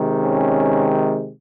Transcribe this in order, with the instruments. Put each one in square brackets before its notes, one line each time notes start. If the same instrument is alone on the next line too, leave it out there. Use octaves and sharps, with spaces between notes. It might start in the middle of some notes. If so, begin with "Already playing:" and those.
Already playing: [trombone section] C3 D#3 G#3
C#4